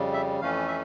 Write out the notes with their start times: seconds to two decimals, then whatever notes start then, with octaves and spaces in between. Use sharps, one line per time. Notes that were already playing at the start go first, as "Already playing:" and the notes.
Already playing: F2 C#3 G3
0.13 E5
0.41 F2 E3 A3 C#4 F5
0.68 E5